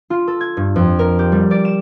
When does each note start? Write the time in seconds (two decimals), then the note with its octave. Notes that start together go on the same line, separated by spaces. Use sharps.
0.10 F4
0.27 A4
0.41 G#6
0.57 G2
0.76 F2
0.99 A#4
1.19 G4
1.32 G3
1.51 D5
1.65 E7